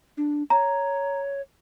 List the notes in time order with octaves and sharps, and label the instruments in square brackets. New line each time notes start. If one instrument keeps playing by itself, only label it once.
[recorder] D4
[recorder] C#5 [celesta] A#5